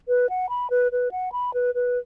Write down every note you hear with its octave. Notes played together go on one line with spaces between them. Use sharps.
B4
F#5
B5
B4
B4
F#5
B5
B4
B4